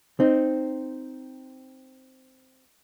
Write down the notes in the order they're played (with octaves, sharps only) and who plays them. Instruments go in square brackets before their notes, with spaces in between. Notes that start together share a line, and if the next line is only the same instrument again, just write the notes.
[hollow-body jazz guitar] C4 D#4